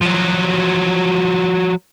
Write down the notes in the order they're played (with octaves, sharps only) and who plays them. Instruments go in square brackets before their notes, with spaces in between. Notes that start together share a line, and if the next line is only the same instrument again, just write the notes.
[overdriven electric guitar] F3 F#3